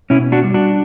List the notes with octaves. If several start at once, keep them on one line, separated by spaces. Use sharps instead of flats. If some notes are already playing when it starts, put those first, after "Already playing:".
B2 C#4 E4
D4 F#4
G3
D4 F#4